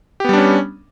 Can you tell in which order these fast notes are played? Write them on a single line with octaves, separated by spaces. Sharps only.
G4 B3 G3 D4 C#4